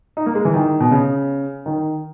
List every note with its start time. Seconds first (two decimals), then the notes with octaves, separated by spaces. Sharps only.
0.17 D#4
0.26 A#3
0.35 G#3
0.45 E3
0.54 D#3
0.80 B2
0.91 C#3
1.66 D#3